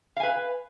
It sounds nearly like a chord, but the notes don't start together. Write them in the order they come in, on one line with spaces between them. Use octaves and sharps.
F5 G#5 B4